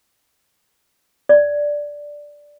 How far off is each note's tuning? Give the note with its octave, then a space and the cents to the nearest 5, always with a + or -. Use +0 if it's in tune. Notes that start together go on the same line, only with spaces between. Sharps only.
D5 -5